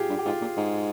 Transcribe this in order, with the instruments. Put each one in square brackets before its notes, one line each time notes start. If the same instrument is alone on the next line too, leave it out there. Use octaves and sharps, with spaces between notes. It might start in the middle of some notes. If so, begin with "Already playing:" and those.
Already playing: [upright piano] F4 G4 G#4
[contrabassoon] G2
[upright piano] G4
[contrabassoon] G#2 [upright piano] F4
[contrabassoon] A#2
G#2